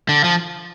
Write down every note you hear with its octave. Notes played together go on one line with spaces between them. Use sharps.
D3
F3